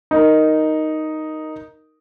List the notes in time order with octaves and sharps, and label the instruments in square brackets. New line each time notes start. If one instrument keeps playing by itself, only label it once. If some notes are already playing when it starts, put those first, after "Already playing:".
[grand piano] D#4 A#4